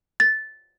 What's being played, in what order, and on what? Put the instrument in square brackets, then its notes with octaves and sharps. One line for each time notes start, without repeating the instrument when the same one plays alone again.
[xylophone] A6